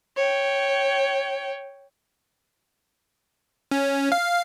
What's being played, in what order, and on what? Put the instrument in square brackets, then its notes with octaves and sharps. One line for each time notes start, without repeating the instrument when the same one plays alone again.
[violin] C#5 G5
[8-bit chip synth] C#4
F5